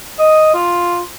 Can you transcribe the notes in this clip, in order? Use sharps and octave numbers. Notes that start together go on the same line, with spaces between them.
D#5
F4